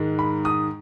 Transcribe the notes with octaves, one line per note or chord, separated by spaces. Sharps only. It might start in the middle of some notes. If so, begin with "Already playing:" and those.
Already playing: G#2 D#3 G#3
B5
D#6